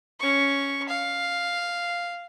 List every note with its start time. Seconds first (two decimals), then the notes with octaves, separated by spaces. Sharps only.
0.20 C#4 C#6
0.89 F5